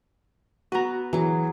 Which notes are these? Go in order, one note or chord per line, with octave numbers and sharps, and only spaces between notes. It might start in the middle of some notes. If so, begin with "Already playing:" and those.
B3 F#4 B4 A#5
E3 F#3 G#4